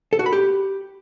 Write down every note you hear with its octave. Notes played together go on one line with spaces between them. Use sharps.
A4
F#4
B5
G4